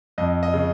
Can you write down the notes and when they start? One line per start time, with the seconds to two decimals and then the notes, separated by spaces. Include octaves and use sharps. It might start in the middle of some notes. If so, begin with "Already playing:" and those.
0.18 F2 D#5
0.43 D#5
0.54 C#3